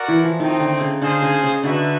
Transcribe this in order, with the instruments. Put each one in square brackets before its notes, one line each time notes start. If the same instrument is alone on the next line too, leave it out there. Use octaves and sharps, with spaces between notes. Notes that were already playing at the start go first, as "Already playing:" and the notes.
Already playing: [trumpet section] F#4 A#4 D5 F#5
[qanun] E3
F3
[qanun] D#3 [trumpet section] A3 C4 D#4
[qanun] D3
C#3
[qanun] D3 [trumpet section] D#4 G#4 C5 F5
[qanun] C#3
C#3
[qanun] D3 [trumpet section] D#4 F#4 B4 E5